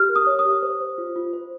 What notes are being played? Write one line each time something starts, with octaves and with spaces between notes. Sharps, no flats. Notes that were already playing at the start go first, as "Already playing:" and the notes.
Already playing: G4 F6
A#4
D#6
C#5
D#6
G4
C5
C5
F4
F4
C5